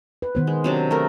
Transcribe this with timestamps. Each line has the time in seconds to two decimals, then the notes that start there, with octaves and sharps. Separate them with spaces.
0.22 B4
0.35 D#3 B3 C5
0.47 G#3
0.64 C3 F#3 D4
0.91 A3 A#4